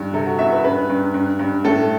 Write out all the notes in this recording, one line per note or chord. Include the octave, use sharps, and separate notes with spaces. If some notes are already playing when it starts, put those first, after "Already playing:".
Already playing: G2
C3 A4
F#4
E2 E5
B4
G2 B4
G2
G2
G2
A2 A4